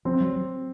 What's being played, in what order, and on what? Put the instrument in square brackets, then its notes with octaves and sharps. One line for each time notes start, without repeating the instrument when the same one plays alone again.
[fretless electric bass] F3 [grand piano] C4
[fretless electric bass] F#3